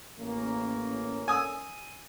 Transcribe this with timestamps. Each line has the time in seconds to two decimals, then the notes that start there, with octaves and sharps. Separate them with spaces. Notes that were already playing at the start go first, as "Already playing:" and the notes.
0.18 A1 A#3 C#4
1.28 G#5 D#6 E6